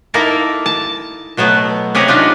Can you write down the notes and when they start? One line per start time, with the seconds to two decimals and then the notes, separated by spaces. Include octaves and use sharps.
0.14 A#3 D#4 E4 A4 A#4 F5
0.66 A5
1.37 B2 F#3 A3 B3
1.95 C3 C#4 G4 G#4 F#5 A#5
2.08 F#3 D4 D#4 F4 G4 G#4